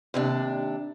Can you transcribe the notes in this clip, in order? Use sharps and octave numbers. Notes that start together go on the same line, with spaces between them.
D#2 C3 D4